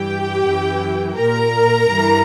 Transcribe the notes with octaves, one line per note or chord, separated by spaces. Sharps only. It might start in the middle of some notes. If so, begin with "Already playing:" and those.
Already playing: G2 E3 G4 G5
F#2 E3
A#2 A#4 A#5
G2 E3